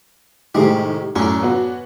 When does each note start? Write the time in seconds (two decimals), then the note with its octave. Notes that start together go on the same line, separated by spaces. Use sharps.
0.55 A2 C3 D#3 G#3 G4
1.16 F#2 A2 C#4 D4 C#5
1.43 B3 F#4